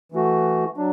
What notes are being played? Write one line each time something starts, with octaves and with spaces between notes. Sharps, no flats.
E3 A3 F#4
F#3 D4